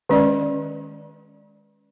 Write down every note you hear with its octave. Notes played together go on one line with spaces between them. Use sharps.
D#3 G#3 C#4 B4 D5